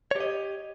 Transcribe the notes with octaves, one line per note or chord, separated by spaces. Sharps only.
G4 C#5 D#5